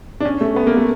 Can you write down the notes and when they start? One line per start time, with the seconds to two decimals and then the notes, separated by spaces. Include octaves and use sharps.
0.20 D4
0.25 C#4
0.41 A3
0.56 B3
0.67 A#3
0.77 A3